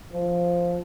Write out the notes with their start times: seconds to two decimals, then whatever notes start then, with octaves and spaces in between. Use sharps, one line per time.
0.12 F3